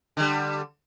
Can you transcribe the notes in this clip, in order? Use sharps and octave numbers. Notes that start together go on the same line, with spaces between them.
D3 G3